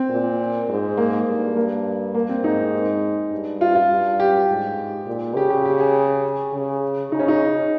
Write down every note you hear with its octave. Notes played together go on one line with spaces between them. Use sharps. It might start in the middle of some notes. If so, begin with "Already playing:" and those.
Already playing: C4
A#2
G#2
A#3
G2
A#3
A#3
C4
G#2 D#4
G2
F4
F4
G2
G4
G#2
A#2
C#3 G4
G4
G4
G#4
C#3
C#3 D#4
C#4
D#4